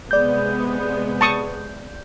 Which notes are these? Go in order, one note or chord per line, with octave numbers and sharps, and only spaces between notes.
C3 G#3 B3 D5 G6
A5 C#6 D#6